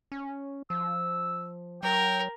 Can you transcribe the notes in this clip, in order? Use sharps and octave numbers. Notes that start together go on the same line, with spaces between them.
C#4
F3 E6
F#3 A#4 G5